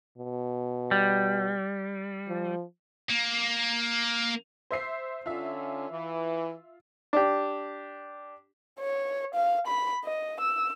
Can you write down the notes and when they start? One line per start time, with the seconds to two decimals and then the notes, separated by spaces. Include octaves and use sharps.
0.18 B2
0.91 G3
2.28 F3
3.10 A#3
4.71 C5 E5 C7
5.26 D3 C#4 F4 E5
5.90 E3
7.13 D4 G4
8.80 C#5
9.34 F5
9.67 B5
10.05 D#5
10.40 E6